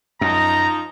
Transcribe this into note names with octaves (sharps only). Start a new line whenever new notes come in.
F#2 F3 D#4 A#5